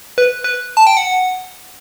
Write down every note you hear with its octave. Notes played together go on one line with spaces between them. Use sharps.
B4
B4
A5
G5
F#5